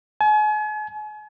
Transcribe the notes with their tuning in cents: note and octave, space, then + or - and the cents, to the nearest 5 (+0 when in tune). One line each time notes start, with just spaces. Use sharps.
G#5 +40